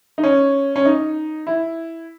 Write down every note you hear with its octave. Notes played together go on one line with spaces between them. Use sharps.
D#4
C#4
C#4
D#4
E4